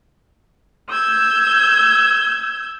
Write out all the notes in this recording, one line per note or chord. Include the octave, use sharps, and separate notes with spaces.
E6 G6 G#6